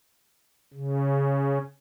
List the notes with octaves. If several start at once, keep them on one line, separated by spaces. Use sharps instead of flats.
C#3